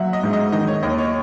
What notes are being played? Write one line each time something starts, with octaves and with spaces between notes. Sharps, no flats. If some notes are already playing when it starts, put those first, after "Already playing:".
Already playing: F#3 E5 F#5
D#5
G#2
D#5
D#3 D#5
C#5
D#2 D#5
C#5